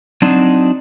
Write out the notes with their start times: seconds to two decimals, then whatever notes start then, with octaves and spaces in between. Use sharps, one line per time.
0.22 F#3 C4 D4 D#4